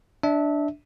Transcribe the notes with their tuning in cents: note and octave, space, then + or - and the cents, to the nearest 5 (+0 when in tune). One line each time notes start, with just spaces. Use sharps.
D4 +0 E5 -25